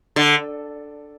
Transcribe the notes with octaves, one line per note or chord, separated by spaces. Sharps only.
D3